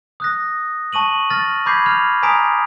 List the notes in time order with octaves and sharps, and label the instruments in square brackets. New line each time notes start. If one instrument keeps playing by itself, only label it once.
[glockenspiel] D#6 F#6 A#6
A5 C#6 D#7 F#7
F6 A6 A#6
B5 D6 G6 G#6 B6 C7
F6 F7
G#5 A#5 D#6 B6 D7 F7